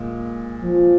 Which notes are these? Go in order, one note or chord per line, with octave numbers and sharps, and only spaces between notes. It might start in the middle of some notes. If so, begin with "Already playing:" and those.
Already playing: A#2 G#3
F3